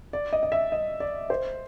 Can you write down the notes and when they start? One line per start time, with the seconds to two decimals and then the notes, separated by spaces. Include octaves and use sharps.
0.13 D5
0.33 D#5
0.43 D#5
0.52 E5
0.72 D#5
1.00 D5
1.30 C5